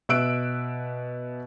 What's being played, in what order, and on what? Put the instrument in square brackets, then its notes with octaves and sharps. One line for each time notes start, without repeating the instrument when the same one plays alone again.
[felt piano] B2 E5 E6 F#6 D7